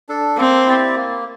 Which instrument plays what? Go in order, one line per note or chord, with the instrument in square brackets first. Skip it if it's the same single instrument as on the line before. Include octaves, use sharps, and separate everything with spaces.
[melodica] D4 A4
[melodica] A#3 [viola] C4
[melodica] E4 G4 D5
A#3